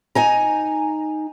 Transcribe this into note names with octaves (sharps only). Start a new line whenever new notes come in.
D#4 G#5 A#5